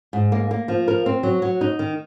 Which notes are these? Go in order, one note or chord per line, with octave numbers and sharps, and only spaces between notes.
G#2
A#3
A#3
F3
A#4
C4
F#3
F#3
D#4
D#3